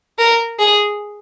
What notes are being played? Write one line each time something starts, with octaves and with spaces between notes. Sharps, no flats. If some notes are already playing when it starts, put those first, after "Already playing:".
A#4
G#4